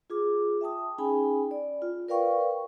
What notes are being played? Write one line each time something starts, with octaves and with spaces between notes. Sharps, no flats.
F4 G#4 D6
E5 G5 A5 D#6
C#4 D#4 G#4 G5 G#5 B5
D5
F4
A#4 B4 D5 F5 G5 C#6